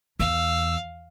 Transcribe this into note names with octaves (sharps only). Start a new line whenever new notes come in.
E2 F5 E6